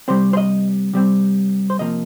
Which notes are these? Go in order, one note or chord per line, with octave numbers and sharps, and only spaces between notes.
C3 G3 C4 C5
C5
D#5
C3 G3 C4
C5
C3 F3 A#3 D#5